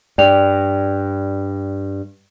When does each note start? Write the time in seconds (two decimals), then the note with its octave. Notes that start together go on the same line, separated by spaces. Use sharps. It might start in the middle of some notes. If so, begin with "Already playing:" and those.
0.18 G2 D5 G5 F7